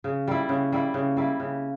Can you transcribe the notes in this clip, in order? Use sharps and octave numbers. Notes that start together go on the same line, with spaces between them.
C#3
G3 A#3 E4
C#3
G3 A#3 E4
C#3
G3 A#3 E4
C#3